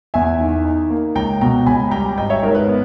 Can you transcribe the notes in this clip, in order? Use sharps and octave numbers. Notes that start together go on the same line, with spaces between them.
E2 E5 G#5
D#3
D#4
A#3
C#2 G5 A#5
B2 G5 A#5
C#2 G#5 B5
G3 G5 A#5
G#1 D#5 G5
C#5 E5
G#2 A#4 C#5
B4
B3